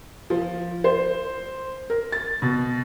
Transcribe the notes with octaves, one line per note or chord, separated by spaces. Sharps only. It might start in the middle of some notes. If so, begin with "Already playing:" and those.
F3
C5
A#4
A6
B2